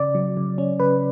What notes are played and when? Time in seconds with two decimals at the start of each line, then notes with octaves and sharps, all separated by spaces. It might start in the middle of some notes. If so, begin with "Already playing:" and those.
Already playing: C#3 D5
0.15 F#3
0.37 C#3
0.58 C#4
0.80 C#3 B4